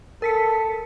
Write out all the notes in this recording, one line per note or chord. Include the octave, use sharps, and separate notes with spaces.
A4 A#4 B6 C#7